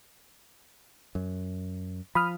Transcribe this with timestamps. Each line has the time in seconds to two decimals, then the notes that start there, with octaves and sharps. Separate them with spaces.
1.15 F#2
2.15 F3 B5 D#6 F6